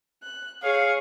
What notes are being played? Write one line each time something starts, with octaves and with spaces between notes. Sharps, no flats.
F#6
G#4 C#5 F5 C#6